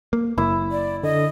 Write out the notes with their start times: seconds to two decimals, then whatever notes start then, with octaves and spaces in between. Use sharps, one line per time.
0.13 A#3
0.38 F#1 A#3 E4
0.72 D5
1.03 D3 D#5